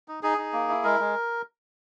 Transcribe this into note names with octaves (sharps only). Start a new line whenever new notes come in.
D#4
D#4 G#4
D#4
A#3
E4
G#3 A#4
G#3